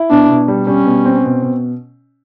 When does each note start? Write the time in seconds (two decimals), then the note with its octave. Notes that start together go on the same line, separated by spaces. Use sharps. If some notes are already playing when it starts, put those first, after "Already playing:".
Already playing: E4
0.10 B2 D4
0.29 B2
0.48 G3
0.67 G3 C#4
0.86 B2
1.05 C4
1.24 B2
1.42 B2